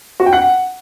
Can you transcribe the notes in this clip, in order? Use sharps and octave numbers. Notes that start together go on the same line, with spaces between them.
F#4
G5
F#5